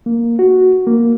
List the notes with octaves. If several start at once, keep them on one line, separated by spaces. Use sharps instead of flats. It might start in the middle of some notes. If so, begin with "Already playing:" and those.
A#3
F#4
A#3